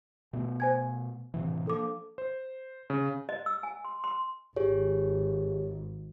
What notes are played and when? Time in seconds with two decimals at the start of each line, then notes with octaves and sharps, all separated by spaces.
0.33 B2 A3 B3
0.60 C5 G#5 G#6
1.34 A2 C3 E3
1.67 F3 A#3 D4 A4 D6
2.18 C5
2.90 C#3
3.29 D#5
3.46 E6
3.63 G#5
3.85 C6
4.04 C6
4.56 G#1 G4 G#4 C#5